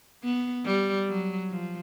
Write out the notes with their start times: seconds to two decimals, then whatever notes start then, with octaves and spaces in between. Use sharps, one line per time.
0.23 B3
0.65 G3
1.08 F#3
1.50 F3